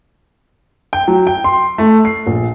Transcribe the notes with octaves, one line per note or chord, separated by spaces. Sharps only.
G5
F#3
G5
C6
A3
C7
A#1